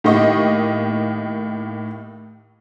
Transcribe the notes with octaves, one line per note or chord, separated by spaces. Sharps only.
A2 D#3 A#3 G4 D#5 C#6